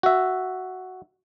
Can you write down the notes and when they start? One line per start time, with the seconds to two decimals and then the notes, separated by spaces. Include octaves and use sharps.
0.03 F#4 E5